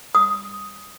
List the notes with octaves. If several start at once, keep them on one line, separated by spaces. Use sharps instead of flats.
D#6